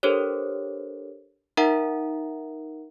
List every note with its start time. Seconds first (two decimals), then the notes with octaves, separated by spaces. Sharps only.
0.03 D4 G4 A4 A#4 C5 C#5
1.57 D#4 A#4 E5 F#5 A#5